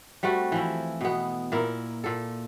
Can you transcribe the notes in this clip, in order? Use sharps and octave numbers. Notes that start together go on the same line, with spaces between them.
G3 A3 C4 F#4
E3 F3 E4
B2 B3
A#2 E4 A#4
A#2 A4